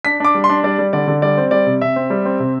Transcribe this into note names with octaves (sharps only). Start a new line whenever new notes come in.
D4 B6
D4 D6
G3
C6
D4
G3 D5
G3
D3 D5
D3
G3 D5
C4
G3 D5
C3
C3 E5
C4
G3
C4
C3